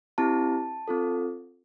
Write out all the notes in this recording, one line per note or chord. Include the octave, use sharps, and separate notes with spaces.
C4 E4 G4 A5
C4 F4 A4